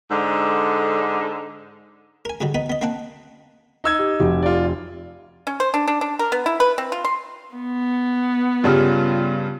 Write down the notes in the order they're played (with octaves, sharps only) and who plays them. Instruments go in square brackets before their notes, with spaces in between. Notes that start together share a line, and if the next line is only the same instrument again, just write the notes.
[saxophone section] G#2 D3
[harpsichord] A#4 G#5
G#2 D3 F#3 G3
B3 D#4 B4
B3 D#5
A#3 C4 D4 F#5
[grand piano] D#4 E6 G#6
[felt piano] G4
F1 F#4 G4
[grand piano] F4 D5
[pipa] C#4
C5
D4
D4
D4
A#4
B3
E4
B4
C4
F4
C6
[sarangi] B3
[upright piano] G2 C#3 G3 [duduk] F4